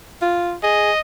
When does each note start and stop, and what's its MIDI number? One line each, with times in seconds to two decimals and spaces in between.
0.22 0.54 65
0.63 0.91 68
0.63 1.00 75